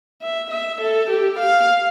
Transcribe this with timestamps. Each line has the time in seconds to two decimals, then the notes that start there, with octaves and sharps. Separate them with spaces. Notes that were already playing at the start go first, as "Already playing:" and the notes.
0.22 E5
0.51 E5
0.81 A4
1.10 G4
1.39 F5